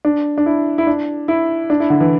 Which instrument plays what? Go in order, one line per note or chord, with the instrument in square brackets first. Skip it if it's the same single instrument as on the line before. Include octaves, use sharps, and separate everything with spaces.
[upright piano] D4
D4
E4
E4
D4
E4
D4
E4
D3
E3